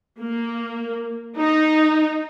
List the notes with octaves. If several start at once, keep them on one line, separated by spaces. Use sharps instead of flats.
A#3
D#4